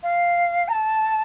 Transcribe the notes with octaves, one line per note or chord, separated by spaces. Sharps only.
F5
A#5
A5